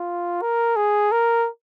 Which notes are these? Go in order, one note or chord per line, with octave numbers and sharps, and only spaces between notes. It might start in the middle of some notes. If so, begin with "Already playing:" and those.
Already playing: F4
A#4
G#4
A#4